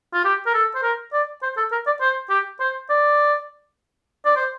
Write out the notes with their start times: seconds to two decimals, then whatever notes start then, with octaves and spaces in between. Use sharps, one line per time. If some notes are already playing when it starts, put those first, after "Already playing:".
0.13 F4
0.25 G4
0.46 A#4
0.54 A4
0.75 C5
0.83 A#4
1.13 D5
1.43 C5
1.57 A4
1.72 A#4
1.87 D5
2.01 C5
2.30 G4
2.60 C5
2.90 D5
4.26 D5
4.36 C5